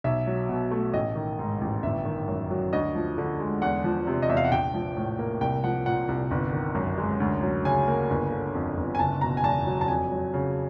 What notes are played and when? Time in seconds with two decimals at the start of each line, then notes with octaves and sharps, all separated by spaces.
0.04 B1 E5
0.27 F#3
0.49 B2
0.71 A3
0.93 A1 D#5
1.16 D#3
1.39 G#2
1.61 A1
1.83 G1 E5
2.05 D#3
2.28 F#2
2.51 F#3
2.73 D2 D#5
2.95 F3
3.18 D3
3.39 G#3
3.62 E2 F#5
3.84 F3
4.07 C3
4.22 D#5
4.29 E2 E5
4.37 F5
4.45 F#5
4.52 A#1 G5
4.74 F3
4.97 A2
5.19 A#3
5.41 C2 G5
5.64 F3 F#5
5.86 A#2 F#5
6.08 C2
6.31 G1
6.53 D#3
6.75 F#2
6.98 G#3
7.20 D2
7.43 F#3
7.65 C#3 G#5
7.87 A#3
8.10 G1
8.32 D3
8.54 F2
8.77 G1
8.95 G#5
8.99 F#1 A5
9.21 B2 A#5
9.37 G#5
9.44 E2 A5
9.66 F#3
9.81 A5
9.88 F2 G#5
10.11 F#3
10.34 C#3